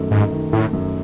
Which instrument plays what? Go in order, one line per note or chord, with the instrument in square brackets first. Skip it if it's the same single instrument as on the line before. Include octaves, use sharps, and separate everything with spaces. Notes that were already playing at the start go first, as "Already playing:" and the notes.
Already playing: [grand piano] F#2 D#3 A3
[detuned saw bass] G#2 [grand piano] D#4
[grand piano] D#3
[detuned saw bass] A2 [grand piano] A3
[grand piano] F#2